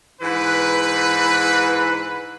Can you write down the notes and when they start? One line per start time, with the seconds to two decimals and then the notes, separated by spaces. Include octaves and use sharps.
0.22 G#2 E3 B4